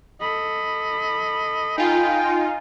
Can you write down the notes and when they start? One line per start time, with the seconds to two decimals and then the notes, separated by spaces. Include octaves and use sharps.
0.21 A4 D#5 B5
1.78 D#4 F4 G5 G#5